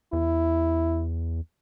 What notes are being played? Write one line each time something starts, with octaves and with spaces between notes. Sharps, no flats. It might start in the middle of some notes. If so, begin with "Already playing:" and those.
E2 E4